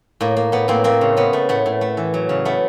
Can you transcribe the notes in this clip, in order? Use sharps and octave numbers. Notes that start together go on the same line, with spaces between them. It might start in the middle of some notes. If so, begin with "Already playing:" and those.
A2 A#3
A#3
A2 B3
A2 A#3 C4
A3 A#3 C4
C#3
C#3 B3
A3
A2 B3
A2
A3
E3
F#3
C#3
A3 B3